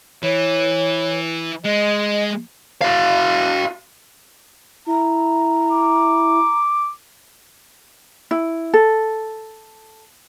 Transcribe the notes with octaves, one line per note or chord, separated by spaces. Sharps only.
E3 C#5
G#3 D#5
F#4 F5
E4 A#5
D6
E4
A4